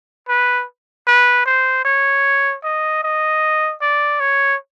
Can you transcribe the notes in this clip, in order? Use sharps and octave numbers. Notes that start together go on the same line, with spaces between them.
B4
B4
C5
C#5
D#5
D#5
D5
C#5